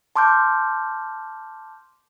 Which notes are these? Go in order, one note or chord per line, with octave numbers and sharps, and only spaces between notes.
A5 C6 D6 F6 G6